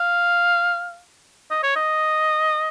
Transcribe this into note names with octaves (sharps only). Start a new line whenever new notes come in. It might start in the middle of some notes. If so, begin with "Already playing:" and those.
Already playing: F5
D#5
C#5
D#5